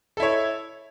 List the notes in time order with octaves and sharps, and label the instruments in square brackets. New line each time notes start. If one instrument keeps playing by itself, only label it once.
[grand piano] A4
E4
C#5